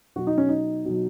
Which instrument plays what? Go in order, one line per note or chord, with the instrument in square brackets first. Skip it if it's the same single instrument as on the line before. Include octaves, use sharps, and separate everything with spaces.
[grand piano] B2 F#3 F#4
D#4
C#4
D#4
B2 F#3